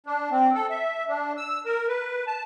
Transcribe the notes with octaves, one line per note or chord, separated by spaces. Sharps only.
D4
C4
A4
E5
D4
E6
A#4
B4
A5